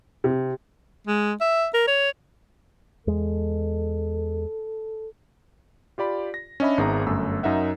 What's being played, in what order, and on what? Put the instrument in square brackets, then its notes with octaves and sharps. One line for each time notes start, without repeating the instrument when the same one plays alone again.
[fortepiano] C3
[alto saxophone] G#3
E5
A#4
C#5
[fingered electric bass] E2 G#3 [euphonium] A4
[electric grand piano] F4 G4 D5 B5
A#6
C#4 D4 D#5 E5 B5
G#1 G#2 B3 G#4 E5 A#5
G1 F#2 A3 E6
F#2 D#4 A#4 E5 F#5